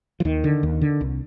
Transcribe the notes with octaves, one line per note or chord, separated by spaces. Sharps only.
F3
D#2 D#3
D3
D#2
D3
C2